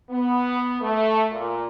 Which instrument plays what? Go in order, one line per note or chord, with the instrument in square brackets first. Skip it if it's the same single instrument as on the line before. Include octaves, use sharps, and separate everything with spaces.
[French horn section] B3
A3
A#2